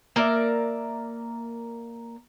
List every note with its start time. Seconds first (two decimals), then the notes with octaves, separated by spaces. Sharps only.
0.16 A#3 A#4 D5 E5